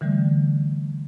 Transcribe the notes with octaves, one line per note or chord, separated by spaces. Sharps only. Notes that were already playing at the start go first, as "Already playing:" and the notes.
D3 E3 G3 A3